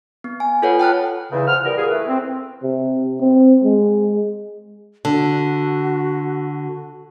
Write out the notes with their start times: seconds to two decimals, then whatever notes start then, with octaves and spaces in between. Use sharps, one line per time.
0.24 B3
0.40 G#5
0.62 F4 A4 B4 C#5 F#5
0.79 G5 A5 F6 F#6
1.32 E2 C#3
1.47 F3 F#5 F6
1.64 G3 B3 A#4
1.76 A#2 G#4
1.90 E3 A3 B4
2.08 C4
2.63 C3
3.20 C4
3.64 G#3
5.05 D3 F#4